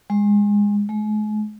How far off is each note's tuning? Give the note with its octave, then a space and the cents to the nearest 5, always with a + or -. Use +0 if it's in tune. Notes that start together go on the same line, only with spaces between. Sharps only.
G#3 -20
G#3 +40